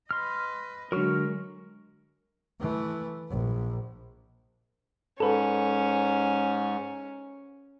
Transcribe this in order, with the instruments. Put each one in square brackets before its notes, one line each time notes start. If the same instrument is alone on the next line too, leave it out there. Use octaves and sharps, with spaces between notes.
[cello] B4 D#5 [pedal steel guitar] C6 F6
[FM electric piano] D3 F#3 [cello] G#3 [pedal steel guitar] A#4 C#6 F6
[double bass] E3 A3
A#1
[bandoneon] G#2 [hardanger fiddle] C#4 [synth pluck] A4 B4